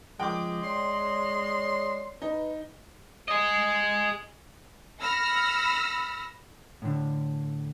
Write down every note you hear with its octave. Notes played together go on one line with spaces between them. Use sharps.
C#2 F3 G#3 G5 D6
C#5 D5 C6
D#4 B4
G#4 D#5
B5 E6 F6 A#6 C#7
A2 D3